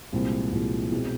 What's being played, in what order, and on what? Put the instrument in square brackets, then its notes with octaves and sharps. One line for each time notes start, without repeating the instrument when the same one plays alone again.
[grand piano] C2 A#2 F3 G#3 C4
C2 A#2 F3 G#3 C4
B2 G#3 C4 E4 G#4